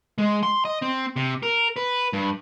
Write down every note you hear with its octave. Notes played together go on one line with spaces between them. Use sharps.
G#3
C6
D#5
C4
C3
A#4
B4
G2